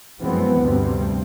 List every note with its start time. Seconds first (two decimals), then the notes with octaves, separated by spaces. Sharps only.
0.20 F#2 E3 F3 G#3 B3 C4
0.59 D2 G2 C3 G3 C4